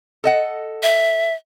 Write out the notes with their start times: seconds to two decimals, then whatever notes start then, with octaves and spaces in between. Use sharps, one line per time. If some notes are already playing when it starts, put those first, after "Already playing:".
0.24 A4 D#5 F#5
0.83 E5